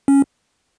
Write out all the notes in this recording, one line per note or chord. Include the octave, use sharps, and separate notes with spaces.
C#4